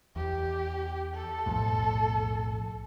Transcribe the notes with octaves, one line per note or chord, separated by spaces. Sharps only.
E2 G4
A4
B1 F2 A2